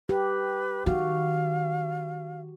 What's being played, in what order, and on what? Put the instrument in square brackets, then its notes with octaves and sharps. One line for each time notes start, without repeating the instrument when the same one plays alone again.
[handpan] G4 [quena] B4
[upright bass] D#3 [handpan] F#4 [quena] F5